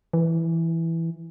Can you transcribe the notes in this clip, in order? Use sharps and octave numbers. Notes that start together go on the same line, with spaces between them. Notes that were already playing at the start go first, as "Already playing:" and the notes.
E3